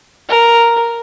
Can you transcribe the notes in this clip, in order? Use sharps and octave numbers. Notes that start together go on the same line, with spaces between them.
A#4